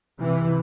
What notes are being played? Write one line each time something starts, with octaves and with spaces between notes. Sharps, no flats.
C3 E3